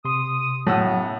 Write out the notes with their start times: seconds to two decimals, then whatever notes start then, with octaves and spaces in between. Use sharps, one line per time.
0.05 C3 C6 D#6
0.67 F#2 A2 C#3 F#3 B3 F#5 E6